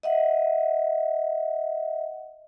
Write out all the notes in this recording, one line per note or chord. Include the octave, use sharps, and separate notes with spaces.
D#5 E5 F#5